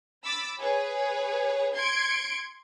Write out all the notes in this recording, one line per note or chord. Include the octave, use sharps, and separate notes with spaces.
B5 D6 E6 A6
G#4 B4 C#5
C6 G#6 C#7 D7